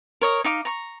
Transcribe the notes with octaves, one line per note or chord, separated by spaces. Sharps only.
A#4 C#5 D#5
D#4 F5 D6
A#5 C#6